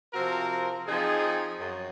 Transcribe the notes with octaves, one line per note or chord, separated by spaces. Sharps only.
C3 F3 C4 F#4 A#4
F3 C4 D#4 G#4
F#2